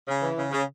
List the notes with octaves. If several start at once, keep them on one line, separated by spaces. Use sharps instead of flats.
C#3
E3
C#3
C#3